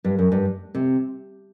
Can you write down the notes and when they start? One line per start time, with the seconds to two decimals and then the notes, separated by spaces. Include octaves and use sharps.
0.04 G2
0.19 F#2
0.32 G2
0.75 C3